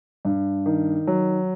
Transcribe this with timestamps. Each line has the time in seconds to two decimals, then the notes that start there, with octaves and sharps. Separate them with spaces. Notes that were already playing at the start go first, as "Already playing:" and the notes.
0.25 G2
0.66 D#3
1.07 F#3